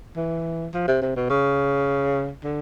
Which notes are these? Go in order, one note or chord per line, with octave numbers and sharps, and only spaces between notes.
E3
F3
C3
C3
B2
C#3
D3